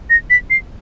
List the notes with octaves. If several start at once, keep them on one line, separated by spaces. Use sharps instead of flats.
A#6
B6
C7